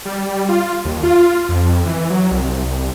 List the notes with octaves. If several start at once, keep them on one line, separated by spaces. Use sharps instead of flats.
G3
F4
D#2
F4
F2
E3
F#3
C2